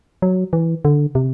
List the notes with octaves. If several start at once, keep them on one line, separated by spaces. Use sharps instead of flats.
F#3
E3
D3
C3